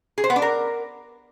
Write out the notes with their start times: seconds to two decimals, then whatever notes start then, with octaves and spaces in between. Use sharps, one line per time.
0.18 G#4
0.24 C5
0.30 B3
0.36 D4
0.42 A#4